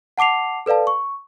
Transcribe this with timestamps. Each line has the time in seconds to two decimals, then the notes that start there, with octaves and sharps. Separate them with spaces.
0.18 F#5 A5 D6 C7 F7
0.66 A4 B4 D5 F5 A5
0.87 C#6